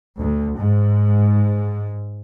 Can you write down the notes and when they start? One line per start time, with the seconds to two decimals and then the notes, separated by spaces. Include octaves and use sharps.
0.19 D2
0.59 G#2